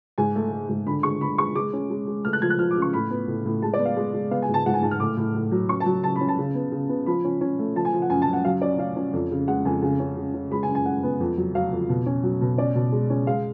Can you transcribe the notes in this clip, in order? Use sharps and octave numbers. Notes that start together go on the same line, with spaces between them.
G#2 G#5
A3
A3
G#2
D3 B5
G#3 C#6
D3 B5
G#3 C#6
G#3 D6
C#4
G#3
G#3
A3 F6
F#6
F3 G#6
F#6
F3 F6
D6
C#3
C#6
A2 B5
B3
A2
A2
G#3 A5
D5
B3
F5
G#3
G#3
B3 F5
G#5
G#2
A5
G#2 F#5
G#5
G#2 A5
F6
A2 D6
A2
A2
F#3
C#4 C#6
A5
F#3
C#3 A5
B5
C#4
A5
C#3
B3
C#3
B3
F3 B5
C#4
C#4
A3
F3 A5
G#5
F3
F#5
F#2 G#5
A5
F#2
F#5
F#3 F5
C#4 D5
C#4 F5
C#4
F2
C#3
G#3 F#5
F2 G#5
C#3 G#5
C#4
C#3
C#4
G#3 B5
G#5
F#2
G#5
F#2 F#5
B3
F2
F#3
F#3 F5
F2
B2
C#4
F#3
B2
C#4 D5
B2
G#3
C#4
G#3 F5